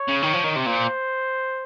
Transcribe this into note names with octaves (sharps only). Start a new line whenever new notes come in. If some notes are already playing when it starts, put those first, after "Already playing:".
Already playing: C#5
C#3
D#3
F3
D#3
C3
A#2 C5